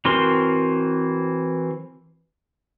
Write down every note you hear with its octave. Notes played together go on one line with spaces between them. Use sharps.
E3 C4 F#4 A#4 C6